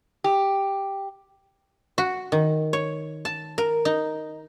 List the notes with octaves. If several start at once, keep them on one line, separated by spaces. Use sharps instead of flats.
G4
F#4
D#3
C#5
A5
A#4
D#4